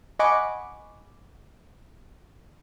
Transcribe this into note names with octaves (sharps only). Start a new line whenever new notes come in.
D#5 F#5 G#5 B5 C#6 D6